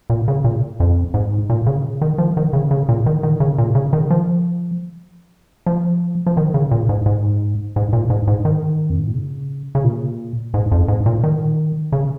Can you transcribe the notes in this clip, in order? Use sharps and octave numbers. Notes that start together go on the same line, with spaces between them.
A#2
C#3
A#2
F2
G#2
A#2
C#3
D#3
F3
D#3
C#3
C#3
A#2
D#3
D#3
C#3
A#2
C#3
D#3
F3
F3
F3
D#3
C#3
A#2
G#2
G#2
G#2
A#2
G#2
G#2
D#3
F2
G#2
A#2
C#3
C#3
A#2
G#2
F2
G#2
A#2
D#3
C#3